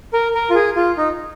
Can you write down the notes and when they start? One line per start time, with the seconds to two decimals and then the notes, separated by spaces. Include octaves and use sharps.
0.13 A#4
0.35 A#4
0.50 F4
0.55 G#4
0.76 F4
0.97 D#4